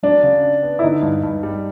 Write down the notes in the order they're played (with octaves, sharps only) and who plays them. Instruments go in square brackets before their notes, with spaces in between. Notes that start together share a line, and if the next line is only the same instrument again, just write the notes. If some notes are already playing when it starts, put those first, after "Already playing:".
[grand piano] F#3 [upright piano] D4
[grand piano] C#3
D4
B3
[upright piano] E4
[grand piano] D3 [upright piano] D#4
[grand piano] G2
G2
G3